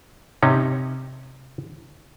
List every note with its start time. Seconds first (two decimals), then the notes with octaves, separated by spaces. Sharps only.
0.43 C3 C#4 D#4